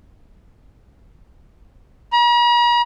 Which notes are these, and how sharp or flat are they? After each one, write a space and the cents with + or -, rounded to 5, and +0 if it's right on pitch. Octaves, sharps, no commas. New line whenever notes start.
A#5 +45